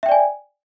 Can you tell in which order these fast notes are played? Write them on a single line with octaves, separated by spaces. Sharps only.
E5 G5 D5 G#5